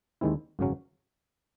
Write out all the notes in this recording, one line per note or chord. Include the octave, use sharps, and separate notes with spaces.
D#2 D#3 G#3 C4 E4
G#1 F#2 C#3 F#3 C#4